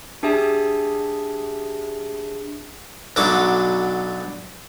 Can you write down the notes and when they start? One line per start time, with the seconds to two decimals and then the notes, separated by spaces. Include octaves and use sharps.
0.23 D4 G4 G#4 E5 G#5 A5
3.16 B1 D3 F#3 D6